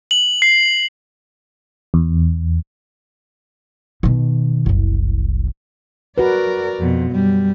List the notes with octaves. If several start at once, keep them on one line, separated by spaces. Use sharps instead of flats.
F#7
C7
E2
B2 D#3
F#1 C2
F#4 A#4 B4 D5
F2 B2
F#2 G3